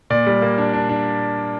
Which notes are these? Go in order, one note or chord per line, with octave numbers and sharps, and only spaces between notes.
A#2 D5
G3
A#3
D4
D4
D4